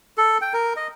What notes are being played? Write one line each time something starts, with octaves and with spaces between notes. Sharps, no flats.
A4
G5
A#4
D#5